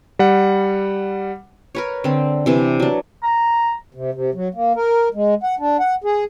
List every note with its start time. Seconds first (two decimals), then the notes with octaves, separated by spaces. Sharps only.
0.19 G3 F#5
1.75 A#4 B4 C#5
2.04 D3 C4
2.46 C3 E3 D4
2.80 F#3 D4
3.23 A#5
3.95 C3
4.14 C3
4.34 F#3
4.55 A#3
4.76 A#4
5.15 G#3
5.43 F#5
5.59 D4
5.80 F#5
6.04 G#4